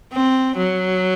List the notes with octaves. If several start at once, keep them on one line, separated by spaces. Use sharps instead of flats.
C4
F#3